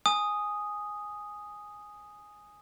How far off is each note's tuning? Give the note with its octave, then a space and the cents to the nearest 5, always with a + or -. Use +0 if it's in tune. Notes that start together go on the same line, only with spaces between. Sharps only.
G#5 +0 D#6 +0